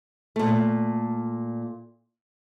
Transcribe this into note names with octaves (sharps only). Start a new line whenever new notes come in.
A#2 A3